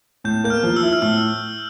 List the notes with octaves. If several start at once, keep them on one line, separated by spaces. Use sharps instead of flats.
A2 G6
A#3 G6
F6
F3
E6
E4
F6
A2 E6